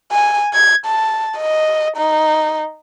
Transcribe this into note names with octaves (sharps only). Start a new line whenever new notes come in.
G#5
G#6
A5
D#5
D#4